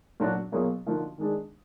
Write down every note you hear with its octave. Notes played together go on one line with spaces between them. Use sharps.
A#2 F#3 D4 F#4
B2 F#3 A#3 F4 G#4
D3 F3 A#3 D#4 F#4
D#3 G#3 D4 G#4